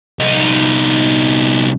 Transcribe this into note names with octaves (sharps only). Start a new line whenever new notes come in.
C2 D#4